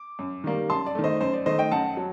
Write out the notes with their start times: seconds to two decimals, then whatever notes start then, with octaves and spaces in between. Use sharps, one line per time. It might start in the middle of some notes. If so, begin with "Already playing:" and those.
Already playing: D6
0.19 F#2
0.44 D#3 G3 A#3
0.70 F#2 A5 C6
0.86 D5
0.95 D#3 A3
1.04 C5 D#5
1.21 F#2 C5
1.33 D5
1.46 D#3 A3 C5 D#5
1.59 D#5 G5
1.71 F#2 F#5 A5
1.97 F#3